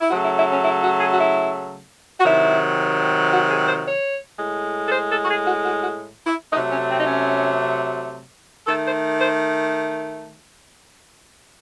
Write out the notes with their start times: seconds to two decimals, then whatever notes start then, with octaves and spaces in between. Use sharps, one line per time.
0.01 E4
0.10 C#3 F#3 A3 F#4
0.23 E4
0.37 E4
0.51 C#4
0.63 E4
0.82 F#4
0.99 G#4
1.13 F#4
1.17 E4
2.19 F#4
2.24 C3 D#3 F#3 E4
3.32 F#4
3.49 G#4
3.67 C5
3.85 C#5
4.38 A2 G#3
4.86 A4
4.91 C5
5.10 A4
5.23 F#4
5.28 G#4
5.46 F#4
5.63 F#4
5.81 F#4
6.26 E4
6.52 A3 D#4
6.55 C3 F#3
6.70 C#4
6.89 C4
6.98 D#4
7.07 C#4
8.67 D#3 A3 A4
8.84 C5
9.21 C5